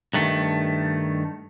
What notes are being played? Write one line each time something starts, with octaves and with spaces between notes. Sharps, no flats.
G2 D#3 A3